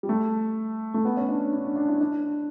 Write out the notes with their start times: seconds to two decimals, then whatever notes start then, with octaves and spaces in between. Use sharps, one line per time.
0.03 G3
0.09 A3
0.94 A3
1.05 B3
1.17 C#4
1.28 D4
1.53 D4
1.65 D4
1.76 D4
1.89 E4
2.01 D4